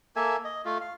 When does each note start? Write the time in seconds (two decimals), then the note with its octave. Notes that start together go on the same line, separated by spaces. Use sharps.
0.16 A#3 A4 E5 G#5
0.45 D#5
0.65 A3 F4
0.81 F5